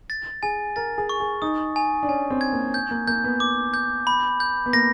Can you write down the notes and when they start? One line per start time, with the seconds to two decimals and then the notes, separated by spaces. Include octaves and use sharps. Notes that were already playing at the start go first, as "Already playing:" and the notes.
0.10 A6
0.43 G#4 G#5
0.76 A#4 A6
0.98 G#4
1.09 C#6
1.20 G#4
1.42 D#4 D#6
1.76 G#5
2.03 D4
2.09 C#4 G#5
2.30 C4
2.41 G#6
2.53 A#3
2.74 G6
2.91 A#3
3.07 A#3 G6
3.24 B3
3.40 D6
3.74 G6
4.07 B5
4.40 G6
4.66 B3
4.73 A#3 A#6